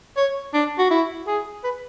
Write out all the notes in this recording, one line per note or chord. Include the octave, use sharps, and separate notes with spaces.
C#5
D4
F#4
E4
G#4
B4